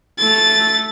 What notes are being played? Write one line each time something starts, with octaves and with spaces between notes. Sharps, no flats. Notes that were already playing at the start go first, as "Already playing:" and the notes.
A3 A6